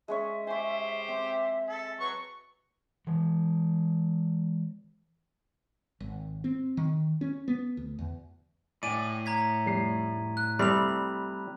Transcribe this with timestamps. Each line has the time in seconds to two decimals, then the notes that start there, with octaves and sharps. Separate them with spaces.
0.08 G#3 C#4 E5 C#6
0.47 G4 C5 G#5 C#6
1.08 C4 E5
1.69 A4
2.00 F#3 B4 C#6
3.07 E3 G#3
6.00 G#1
6.44 C4
6.77 D#3
7.21 C#4
7.48 B3
7.77 D2
7.99 E2
8.83 A2 D5 G5 G#5 D#7
9.26 A#5 G#6 B6
9.66 F1 G3 C7
10.37 F#6
10.59 C2 G3 A3 C4 B5 F7